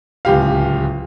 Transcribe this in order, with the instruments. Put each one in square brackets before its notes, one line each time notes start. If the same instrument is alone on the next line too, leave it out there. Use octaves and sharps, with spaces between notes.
[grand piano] D1 C#2 G4 F5